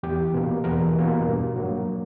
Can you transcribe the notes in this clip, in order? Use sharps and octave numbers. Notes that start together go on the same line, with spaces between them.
E2 G4
B2 A#3
E2 A#4
B2 A#3
G2
F#3 A#3